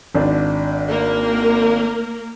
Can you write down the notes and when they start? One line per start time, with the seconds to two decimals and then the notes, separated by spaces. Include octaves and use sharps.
0.15 G#1 D4
0.90 A#3 A#4